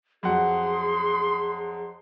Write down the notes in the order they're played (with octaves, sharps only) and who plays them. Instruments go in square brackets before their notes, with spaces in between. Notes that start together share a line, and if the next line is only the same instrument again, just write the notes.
[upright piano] F2 F#3 F#5 [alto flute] G#4 [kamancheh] C6